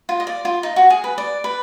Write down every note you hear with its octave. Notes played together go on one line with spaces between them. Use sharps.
F4
D#5
D5
F4
D#4
F#4
G#4
B4
D5
B4